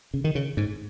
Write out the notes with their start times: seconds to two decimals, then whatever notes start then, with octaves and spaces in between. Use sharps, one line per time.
0.14 C#3
0.24 D#3
0.35 C#3
0.57 G#2